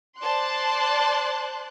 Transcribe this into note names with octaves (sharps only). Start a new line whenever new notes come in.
C5 D5 A5 C6 F#6